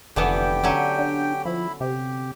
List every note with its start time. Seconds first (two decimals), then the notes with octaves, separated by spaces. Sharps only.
0.16 F1 D3 E3 B3 G4 G5
0.64 D3 F#3 C#4
0.99 D4
1.45 F3 E4 B5
1.80 C3 G4